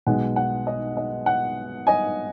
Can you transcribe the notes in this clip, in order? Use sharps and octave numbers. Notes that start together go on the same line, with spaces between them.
B1 B2 G#3 F#5
F#5
D#5
D#5
F#5
D#5 G#5